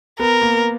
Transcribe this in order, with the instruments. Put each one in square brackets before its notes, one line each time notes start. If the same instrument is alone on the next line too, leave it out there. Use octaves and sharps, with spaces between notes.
[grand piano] B3 [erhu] A#4
[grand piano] A#3